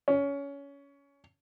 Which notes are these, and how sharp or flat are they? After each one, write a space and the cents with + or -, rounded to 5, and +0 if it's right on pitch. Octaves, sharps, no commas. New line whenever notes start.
C#4 +20